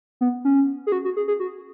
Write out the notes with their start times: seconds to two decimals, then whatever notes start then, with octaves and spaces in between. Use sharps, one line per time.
0.21 B3
0.45 C#4
0.87 G#4
0.92 F#4
1.05 F#4
1.17 G#4
1.28 G#4
1.40 F#4